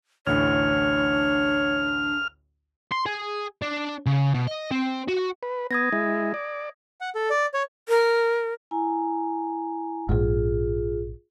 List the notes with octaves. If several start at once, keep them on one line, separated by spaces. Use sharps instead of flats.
A1 D2 A2 D4 C#5 F6
C6
G#4
D4
C#3
B2
D#5
C4
F#4
B4
B3 D#6 G#6 A#6
G#3 E4
D5
F#5
A4
D5
C#5
A#4
E4 G#5 A#5
A#1 G#2 F4 G#4